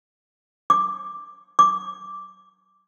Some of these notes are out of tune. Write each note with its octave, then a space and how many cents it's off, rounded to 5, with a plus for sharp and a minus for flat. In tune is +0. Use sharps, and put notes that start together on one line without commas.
D6 +5
D6 -5